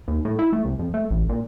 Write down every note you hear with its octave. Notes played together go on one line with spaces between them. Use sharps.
D#2
A2
E4
A3
C2
F2
A3
A1
A#2